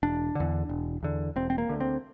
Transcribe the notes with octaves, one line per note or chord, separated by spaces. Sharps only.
E1 D4
E2 D3
E1
E2 D3
E1 C4
C4
A#3
D2 D3
C4